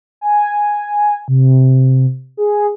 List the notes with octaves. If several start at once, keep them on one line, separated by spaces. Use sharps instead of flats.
G#5
C3
G#4